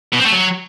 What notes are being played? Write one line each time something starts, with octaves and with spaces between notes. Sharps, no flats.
B2
C4
A3
F#3